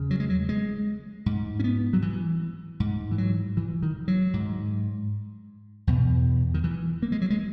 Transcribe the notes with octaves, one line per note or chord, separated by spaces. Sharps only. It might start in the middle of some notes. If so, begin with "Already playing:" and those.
Already playing: E2 C#3
F#3
G#3
F#3
G#3
G#2
C#4
B3
F#3
E3
G#2
E3
F#3
E3
D#3
F#3
G#2
E2 B2
D#3
E3
A#3
G#3
F#3
G#3